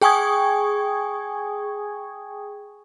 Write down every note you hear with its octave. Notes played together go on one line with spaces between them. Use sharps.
G#4 G5 G#5 C#6 D#6 G#6